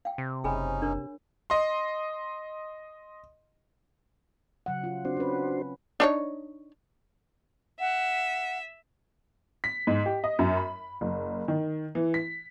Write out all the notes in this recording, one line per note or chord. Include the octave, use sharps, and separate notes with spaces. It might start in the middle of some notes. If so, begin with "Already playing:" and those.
F5 G5
C3
F#1 C#4 D#4 G#4 G#5 B5
D4 A#4 C#5
D#5 C6
C#3 F#3 F#5
F4
C4 D4 F#4 C5
C#4 B4
D4 D#4 C#5
E5 F#5
B6
G#2
G4
D#5
F#2
B5
F#1
D#3
E3
B6